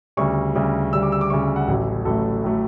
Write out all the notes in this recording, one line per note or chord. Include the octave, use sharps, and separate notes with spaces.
D2 C#3 G3 C#6
D2 C#3 G3
D2 C#3 G3 E6
D6
E6
D6
D2 C#3 G3 C#6
F#5
A1 A2 F#3 A3
A1 A2 F#3 A3 A4
A2 F#3 A3